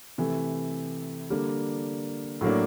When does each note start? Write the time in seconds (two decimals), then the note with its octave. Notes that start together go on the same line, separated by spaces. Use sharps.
0.18 C3 E3 A3
1.30 D3 G3 A#3 D4
2.41 A2 F#3 A#3 D4